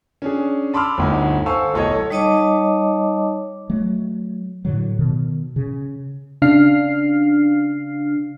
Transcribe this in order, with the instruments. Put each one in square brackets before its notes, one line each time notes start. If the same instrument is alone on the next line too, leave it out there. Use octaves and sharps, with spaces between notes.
[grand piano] C#4 D4 G#4
A5 B5 C6 D6 E6 F6
G1 D2 D#4
A4 C5 F5 G#5 C#6 E6
D1 B1 A4 C#5 D#5 G#6
[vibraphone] G3 D#4 C#5 D#5 A5 D6
[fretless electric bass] F#3 A3
A2 D3 F#3
B2 D#3
C#3
[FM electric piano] C#3 D4 F5 F6 C7